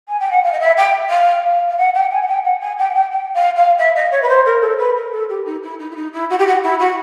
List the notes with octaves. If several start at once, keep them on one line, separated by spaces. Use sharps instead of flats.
G#5
G5
F#5
F5
D#5
E5
G5
F5
F5
F#5
G5
G#5
F#5
G5
F#5
G#5
G5
F#5
G5
G5
F5
F5
E5
D#5
C#5
B4
C5
A#4
A4
B4
A#4
A4
G4
D#4
E4
D#4
E4
D#4
E4
F#4
G4
F#4
E4
F#4